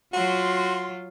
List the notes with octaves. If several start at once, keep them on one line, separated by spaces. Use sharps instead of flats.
F#3 F4 F#4 C6